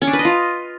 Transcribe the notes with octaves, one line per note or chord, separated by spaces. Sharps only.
C#4
D4
B4
D#5
F4